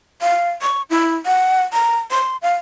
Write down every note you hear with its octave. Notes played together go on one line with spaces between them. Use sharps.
F5
C#6
E4
F#5
A#5
C6
F5